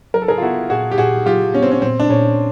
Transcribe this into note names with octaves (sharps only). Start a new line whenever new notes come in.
F#3 A#4
A4
G#4 A#4
F4
B3 E4 F#4
A#2 F#4 G#4
G4
A#2 F#4 G#4
F#3 F4 G4
B3 C#4
C4
C#4
A#2 C4
D4
A#2 C#4